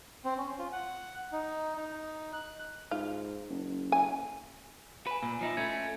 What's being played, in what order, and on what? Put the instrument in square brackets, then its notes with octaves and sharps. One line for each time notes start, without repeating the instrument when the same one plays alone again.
[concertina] C4
C#4
F4
F#5
D#4
D#4
F#6
[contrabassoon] G#2 [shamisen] F4
[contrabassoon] F#1
[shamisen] G#5
[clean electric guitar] B4 [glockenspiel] G#5 E7
[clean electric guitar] A#2
F3 D#4 E4
[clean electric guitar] A3 C#4 [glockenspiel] G#6
[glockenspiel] G#5